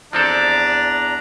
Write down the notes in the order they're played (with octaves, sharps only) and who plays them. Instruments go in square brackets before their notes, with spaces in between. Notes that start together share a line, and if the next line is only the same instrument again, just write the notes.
[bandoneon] E2 A#5 [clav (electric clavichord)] F3 C4 A4 [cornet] D4 [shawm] D5